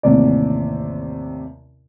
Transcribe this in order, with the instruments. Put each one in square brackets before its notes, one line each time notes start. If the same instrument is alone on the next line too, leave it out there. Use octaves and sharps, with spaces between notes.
[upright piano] A1 D#2 C3 D5